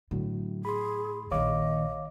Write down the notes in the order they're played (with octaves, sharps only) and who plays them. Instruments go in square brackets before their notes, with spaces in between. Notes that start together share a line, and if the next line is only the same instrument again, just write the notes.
[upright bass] A2 [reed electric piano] D3 F#3
[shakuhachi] G#4 [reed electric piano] B5 C6
[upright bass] A#1 D#3 [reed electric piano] C#5 F5 D6 [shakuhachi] D#5